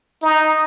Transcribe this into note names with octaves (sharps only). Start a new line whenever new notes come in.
D#4